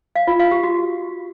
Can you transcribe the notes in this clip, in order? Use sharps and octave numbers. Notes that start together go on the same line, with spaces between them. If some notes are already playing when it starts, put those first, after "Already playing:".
F5
F4
F5
G4
F#4